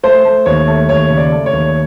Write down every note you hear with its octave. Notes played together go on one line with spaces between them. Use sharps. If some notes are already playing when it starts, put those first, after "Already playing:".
A3 C5
A3
D#2 C#5
A3
D#2 C#5
C#3
D5
A3
C#5
D#2